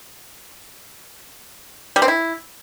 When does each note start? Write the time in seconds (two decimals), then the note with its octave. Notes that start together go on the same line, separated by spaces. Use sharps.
1.96 G3
2.02 C4
2.08 E4